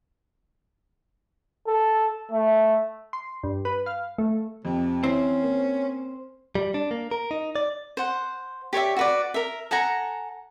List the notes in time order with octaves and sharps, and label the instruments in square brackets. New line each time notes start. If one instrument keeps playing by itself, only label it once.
[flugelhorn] A4
A3
[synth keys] C6
G2
B4
F5
A3
[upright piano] F2 [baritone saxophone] C3
[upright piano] E3 [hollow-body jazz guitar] C4 [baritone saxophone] C#4
[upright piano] A#3
[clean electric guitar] G3
D4
A#3
A#4
D#4
D5
[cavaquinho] C5 F#5
G4 C#5 D5 E5
F#4 B4 D5
A#4 E5
A4 F#5 G#5 A#5